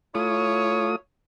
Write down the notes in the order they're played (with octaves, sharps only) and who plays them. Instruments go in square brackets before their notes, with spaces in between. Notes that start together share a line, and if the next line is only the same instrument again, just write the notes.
[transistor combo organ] A3 F4 D#6 [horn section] E4 C#5